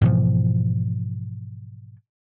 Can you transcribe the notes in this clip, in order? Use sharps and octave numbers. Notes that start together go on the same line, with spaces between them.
G#2 B2 E3 F3